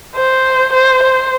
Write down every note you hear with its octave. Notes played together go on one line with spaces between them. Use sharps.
C5
C5
C5